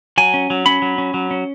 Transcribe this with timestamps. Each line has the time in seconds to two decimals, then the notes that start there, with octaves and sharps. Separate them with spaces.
0.18 F#3 G#5
0.34 C#4
0.50 F#3
0.66 C#4 B5
0.82 F#3
0.98 C#4
1.14 F#3
1.31 C#4